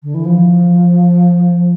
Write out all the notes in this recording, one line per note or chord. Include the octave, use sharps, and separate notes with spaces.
D3
E3
F3